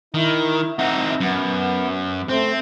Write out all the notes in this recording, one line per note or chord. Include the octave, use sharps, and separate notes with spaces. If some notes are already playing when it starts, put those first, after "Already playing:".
D#3 E4
C4 D#4 E5 F#5
F#2 B3
A3 C4 C5